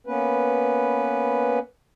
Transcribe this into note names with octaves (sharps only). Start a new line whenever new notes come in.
A#3 B3 C#4 B4